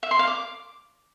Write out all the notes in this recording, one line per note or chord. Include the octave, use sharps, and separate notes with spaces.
E5
C6
F5
D6